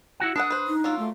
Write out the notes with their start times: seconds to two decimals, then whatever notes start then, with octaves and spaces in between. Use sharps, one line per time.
0.20 E4 F#4 F#5
0.36 D4 A4 B4 F#5 D#6
0.50 B4 C5
0.68 D#4
0.84 F#3 A#3 F4 E6
0.99 A3